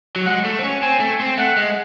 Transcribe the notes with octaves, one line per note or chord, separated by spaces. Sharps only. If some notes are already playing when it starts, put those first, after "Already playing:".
F#3
G#3 F#5
A3
C4
C#4
C4 G#5
A3
C4
A3 F#5
G#3